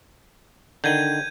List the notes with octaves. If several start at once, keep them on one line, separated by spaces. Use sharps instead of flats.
D3 D#3 G6 G#6 D#7